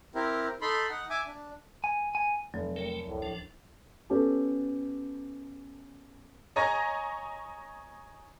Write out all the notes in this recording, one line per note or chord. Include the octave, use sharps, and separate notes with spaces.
C4 E4 G4 A#4
D#4 A4 B5 C6
D#4 F#5
E5 G#5 D6
D4
G#5
G#5
F1 F#3
A3 A#4 C#5 G5
C#2 A2
D2 F3 D4
B3 C#4 G4 A4
C#5 D#5 G#5 A#5 C#6 A#6